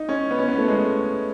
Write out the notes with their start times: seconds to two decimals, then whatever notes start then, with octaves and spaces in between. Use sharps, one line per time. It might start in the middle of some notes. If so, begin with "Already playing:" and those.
Already playing: D#4
0.09 C#4
0.31 B3
0.39 C#4
0.48 B3
0.58 A3
0.68 G#3